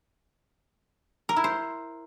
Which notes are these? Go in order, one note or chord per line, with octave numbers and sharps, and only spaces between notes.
A#4
E4
C5